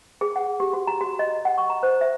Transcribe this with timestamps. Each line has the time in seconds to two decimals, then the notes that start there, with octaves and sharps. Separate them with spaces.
0.21 G#4
0.36 F#5
0.60 G4
0.73 F#4
0.87 A#5
1.01 F#4
1.19 D#5
1.45 F#5
1.58 C#6
1.70 A#5
1.83 C5
2.01 E5